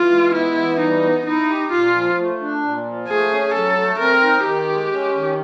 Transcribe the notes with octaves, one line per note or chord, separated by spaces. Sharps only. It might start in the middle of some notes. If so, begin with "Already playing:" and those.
Already playing: E3 F4
G#3
B3 E4
E3
G3 D#4
B3
D#4 E4
G4
A#2 F4
F3
A3
D4
A#2
F3
A3 G#4
C#4
F#3 A4
A3
C4 A#4
D#4
D#3 G4
G#3
C#4
D#3